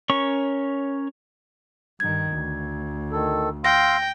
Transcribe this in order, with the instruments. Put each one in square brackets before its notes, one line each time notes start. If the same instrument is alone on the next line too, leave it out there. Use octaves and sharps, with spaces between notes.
[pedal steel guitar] C#4 A#4 C#5 C#6
[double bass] G2 D#3 [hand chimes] G#6
[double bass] D2
[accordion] D#3 A4
[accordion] F5 C6 E6 [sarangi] G5 [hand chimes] A#6